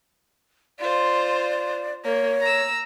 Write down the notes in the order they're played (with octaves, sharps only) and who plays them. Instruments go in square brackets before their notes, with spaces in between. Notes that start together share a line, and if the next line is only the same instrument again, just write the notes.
[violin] F4 C5 [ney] D5
[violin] A#3 [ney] C#5
[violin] A#5 E6